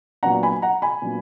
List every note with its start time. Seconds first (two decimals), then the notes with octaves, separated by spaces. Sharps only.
0.23 A#2 F#3 B3 D4 F#5 A#5
0.43 G#5 B5
0.62 F#5 A#5
0.82 G#5 B5
1.02 A#2 F#3 B3 D4